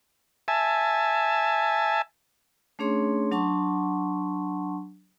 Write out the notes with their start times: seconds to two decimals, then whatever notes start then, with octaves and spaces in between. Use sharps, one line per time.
0.48 E5 G#5 A5
2.79 A3 C#4 D4 G#4 C#5 C6
3.31 F#3 D4 F#5 A5 C6 C#6